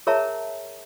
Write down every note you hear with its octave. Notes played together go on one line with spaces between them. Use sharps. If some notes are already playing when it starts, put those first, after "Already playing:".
G#4 A#4 C#5 E5 A5 A#5